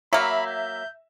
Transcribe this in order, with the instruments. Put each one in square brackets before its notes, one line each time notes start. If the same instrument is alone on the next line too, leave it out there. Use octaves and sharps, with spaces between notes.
[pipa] F#3 A#3 [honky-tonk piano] E5 [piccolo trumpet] B5
[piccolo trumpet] G6